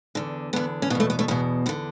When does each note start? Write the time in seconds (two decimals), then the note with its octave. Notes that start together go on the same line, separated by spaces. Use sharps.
0.15 E2 D3
0.53 E2 D3 B3
0.82 C#4
0.90 B2 B3
0.95 E2 A3
1.10 B3
1.19 A3 C#4
1.28 E2 B2 B3
1.66 E2 B3
1.69 D3